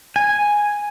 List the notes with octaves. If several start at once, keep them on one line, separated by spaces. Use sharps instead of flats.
G#5